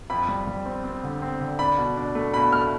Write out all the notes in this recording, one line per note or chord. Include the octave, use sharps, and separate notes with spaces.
F2 B5
G3
G3
C4
C4
D3
C4
D3
D4 B5
B2
D4
A3
B2 B5
A3 F6